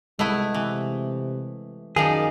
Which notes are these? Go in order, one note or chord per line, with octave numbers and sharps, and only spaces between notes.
C2 G#3 A3 B3 E4
C3 E3
F#2 D#3 F3 D#4 G#4 D5